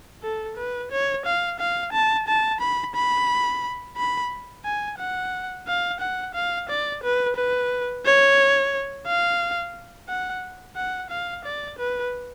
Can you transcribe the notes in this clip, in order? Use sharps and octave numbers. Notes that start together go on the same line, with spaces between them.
A4
B4
C#5
F5
F5
A5
A5
B5
B5
B5
G#5
F#5
F5
F#5
F5
D5
B4
B4
C#5
F5
F#5
F#5
F5
D5
B4